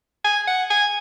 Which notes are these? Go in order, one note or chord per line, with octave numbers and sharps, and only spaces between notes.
G#5
F#5
G#5